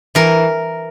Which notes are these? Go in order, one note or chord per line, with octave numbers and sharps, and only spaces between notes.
E3 A#4